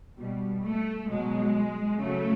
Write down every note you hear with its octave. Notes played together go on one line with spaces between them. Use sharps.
B2 G3
A3
B2 F#3 G#3
C#3 F#3 A3